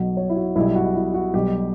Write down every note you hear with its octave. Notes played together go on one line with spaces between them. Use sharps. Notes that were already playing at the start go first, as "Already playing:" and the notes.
Already playing: B1 B2 F#3
C#5
E4
F#4
B1 B2 G3 E4
F#4
E4
F#4
B1 B2 G3 G4